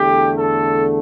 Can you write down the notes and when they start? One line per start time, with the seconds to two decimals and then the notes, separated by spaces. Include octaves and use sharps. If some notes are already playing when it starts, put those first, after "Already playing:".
Already playing: E2 D3 A3 G4
0.35 A4